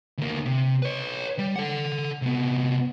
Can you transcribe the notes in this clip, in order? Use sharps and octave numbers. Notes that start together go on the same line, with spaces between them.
D2 A#3
C3
B4 C#5
G3
A4 F#5
C3 B3